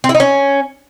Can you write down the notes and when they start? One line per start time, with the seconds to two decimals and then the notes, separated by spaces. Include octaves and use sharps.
0.04 C4
0.09 E4
0.15 D#4
0.20 C#4